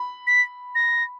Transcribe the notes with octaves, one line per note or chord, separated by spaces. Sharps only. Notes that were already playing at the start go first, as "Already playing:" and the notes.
Already playing: B5
B6
A#6